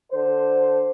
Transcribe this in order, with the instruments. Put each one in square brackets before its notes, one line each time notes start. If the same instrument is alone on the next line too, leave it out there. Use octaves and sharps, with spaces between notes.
[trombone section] D3 C5